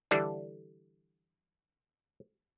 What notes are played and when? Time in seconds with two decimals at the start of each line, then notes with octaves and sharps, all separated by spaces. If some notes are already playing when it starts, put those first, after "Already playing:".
0.11 D3 E3 G3 D4